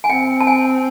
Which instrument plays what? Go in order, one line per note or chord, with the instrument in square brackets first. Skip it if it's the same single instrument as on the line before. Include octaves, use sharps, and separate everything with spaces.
[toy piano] G#5
[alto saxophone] C4 [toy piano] G5
[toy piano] A5
G#5